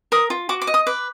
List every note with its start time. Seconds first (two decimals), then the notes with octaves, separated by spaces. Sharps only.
0.12 A#4 D#6
0.30 F4
0.49 F#4 D6
0.61 D6
0.67 D#5
0.74 D#6
0.87 B4 D6